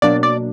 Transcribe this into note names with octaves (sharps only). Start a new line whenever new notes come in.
B2 F#3 A#3 D4 D5
D5